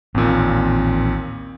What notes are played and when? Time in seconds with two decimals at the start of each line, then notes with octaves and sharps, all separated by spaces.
0.15 A1 D#2 A#2 C4